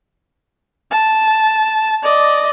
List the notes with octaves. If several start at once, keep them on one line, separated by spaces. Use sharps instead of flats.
A5
D5 D#5